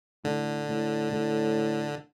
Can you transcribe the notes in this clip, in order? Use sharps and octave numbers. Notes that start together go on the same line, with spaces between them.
A2 D3
A2
A2